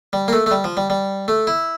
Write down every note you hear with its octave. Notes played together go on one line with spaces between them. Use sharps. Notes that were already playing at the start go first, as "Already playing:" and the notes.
G3
A#3
A3
A3
G3
F3
G3
G3
A3
E4